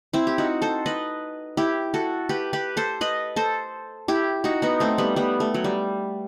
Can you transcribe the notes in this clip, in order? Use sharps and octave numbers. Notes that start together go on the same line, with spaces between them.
C4 E4
G4
D#4 F#4
A4 C5
B4 D#5
E4 G4
F#4 A4
G4 B4
G4 B4
A4 C5
B4 D#5
A4 C5
E4 G4
D#4 F#4
B3 D#4
A3 C4
G3 B3
G3 B3
A3
F#3
G3